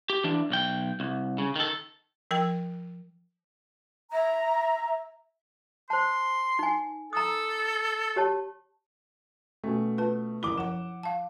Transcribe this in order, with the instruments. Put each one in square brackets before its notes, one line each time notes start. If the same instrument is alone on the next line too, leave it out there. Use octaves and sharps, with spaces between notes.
[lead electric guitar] G4
E3 D4
B1 G5
C2
C#3
D#3 A4
[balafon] F3 A#4 G5
[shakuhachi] E5 [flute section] A#5
[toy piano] C5 A5 [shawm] C6
[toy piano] D#4 G#5
[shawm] A4 [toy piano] A#5 D#6
[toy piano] G4 C#5 A5
[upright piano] B2 A3 [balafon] C#4 G#5
[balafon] F4 B4 A5
[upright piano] F#1 D6 G7 [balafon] E4
[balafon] F3 D6 [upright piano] F#5 E7
[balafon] F5 A5